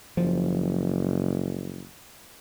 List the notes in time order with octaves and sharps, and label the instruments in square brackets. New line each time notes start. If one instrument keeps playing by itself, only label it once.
[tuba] F#1 [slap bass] F3